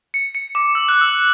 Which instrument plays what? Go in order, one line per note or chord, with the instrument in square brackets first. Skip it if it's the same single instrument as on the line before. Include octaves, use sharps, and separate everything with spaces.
[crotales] C#7
C#7
D6
E6
F#6
E6